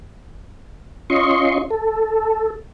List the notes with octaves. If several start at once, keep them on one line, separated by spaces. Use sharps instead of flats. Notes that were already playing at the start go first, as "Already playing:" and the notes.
C#4 F4 D#5 C6 C#6
A4